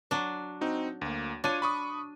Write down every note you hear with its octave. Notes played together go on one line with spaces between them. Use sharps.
F#3 D4
C4 D#4 F#4
D2 A#3
D4 F4 C#5 D#7
B5 C#6 D#6